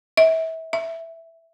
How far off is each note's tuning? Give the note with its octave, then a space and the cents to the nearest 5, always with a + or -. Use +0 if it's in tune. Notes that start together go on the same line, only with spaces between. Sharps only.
E5 -30
E5 +0